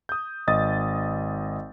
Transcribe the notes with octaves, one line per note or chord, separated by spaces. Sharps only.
D#6 G6
G#1 D#5 D#6 A6